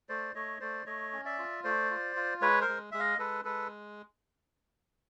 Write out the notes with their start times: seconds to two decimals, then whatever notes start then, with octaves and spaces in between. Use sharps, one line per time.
0.09 A3 C5 D5
0.35 A3 C#5 D#5
0.60 A3 C5 D5
0.86 A3 C#5 D#5
1.13 C#4
1.25 D5 E5
1.39 F4
1.64 A3 C5 D5
1.90 F4
2.16 F4
2.41 G#3 B4 C#5
2.61 A#4 C5
2.68 G#3
2.91 G#3 E5
2.99 D#5 F5
3.19 G#3 A4 B4
3.45 G#3 A4 B4